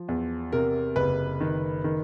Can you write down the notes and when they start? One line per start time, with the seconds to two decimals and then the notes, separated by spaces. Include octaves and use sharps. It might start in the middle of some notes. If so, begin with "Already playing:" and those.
Already playing: F3
0.08 E2
0.53 C3 A#4
0.96 F#1 B4
1.41 D#3
1.84 D#3